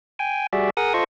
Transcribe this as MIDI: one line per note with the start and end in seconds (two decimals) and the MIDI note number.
0.19 0.47 79
0.19 0.47 80
0.53 0.70 55
0.53 0.70 66
0.53 0.70 68
0.53 0.70 74
0.53 0.70 76
0.77 0.93 68
0.77 0.93 70
0.77 0.93 78
0.77 0.93 87
0.94 1.04 65
0.94 1.04 69
0.94 1.04 72
0.94 1.04 75
0.94 1.04 85